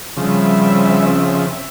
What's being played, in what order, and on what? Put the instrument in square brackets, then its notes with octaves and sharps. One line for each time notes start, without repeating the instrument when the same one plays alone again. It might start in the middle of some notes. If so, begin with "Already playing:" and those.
[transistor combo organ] C#3 F3 [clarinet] G3 [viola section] C4 C#4 E5